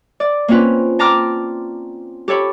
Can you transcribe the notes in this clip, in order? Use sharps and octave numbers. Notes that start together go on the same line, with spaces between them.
D5
A#3 C4 C#4 F4 B4
G5 A5 A#5 C6 D6 F6
G4 A4 C#5 B5